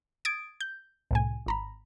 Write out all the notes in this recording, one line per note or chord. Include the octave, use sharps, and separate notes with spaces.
D#6 G#6 A6 D7
G6
C2 A2 G#5
G#1 A#5 B5